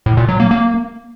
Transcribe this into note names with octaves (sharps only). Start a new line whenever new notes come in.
A2
A#2
F#3
A#3
A#3